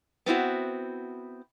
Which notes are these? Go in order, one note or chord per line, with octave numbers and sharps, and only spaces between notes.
B3 C4 E4 F#4